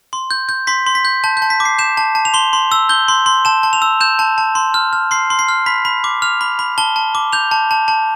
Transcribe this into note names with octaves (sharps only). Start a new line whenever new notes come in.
C6
G6
G6
C6 B6
C6
B6
G6
A5 G6
G6
A5
B6
D6
C7
G6 E7
A5
A5
F7
C6 G7
C6
E6
G6 G7
C6
C6
A5 E7
A5
F7
E6
G6 E7
A5
A5
C6
F6
F6
C6 C7
C6
C7
F6
B5 B6
B5
D6
F6 F7
B5
B5
A5 G7
A5
D6
G6 F7
A5
A5
A5